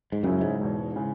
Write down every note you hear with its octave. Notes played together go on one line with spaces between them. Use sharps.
G#2
C#2 F#2 C#3 F#3 C#4 E4
G#2
E1 E2 B2
C#3 E3 G#3